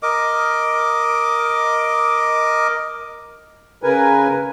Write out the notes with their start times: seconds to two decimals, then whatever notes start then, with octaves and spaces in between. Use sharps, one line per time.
0.03 A#4 D#5 D6
3.83 C#3 A#4 B4 G#5